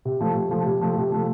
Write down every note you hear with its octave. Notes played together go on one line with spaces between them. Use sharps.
C3
F3 A3
C3
F3 A3
C3
F3 A3
C3
F3 A3